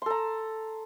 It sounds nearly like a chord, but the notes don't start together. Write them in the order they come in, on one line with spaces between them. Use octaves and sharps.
C6 A4 A#5